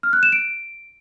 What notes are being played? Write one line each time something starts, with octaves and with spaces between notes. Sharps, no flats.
F6
F#6
E7
D7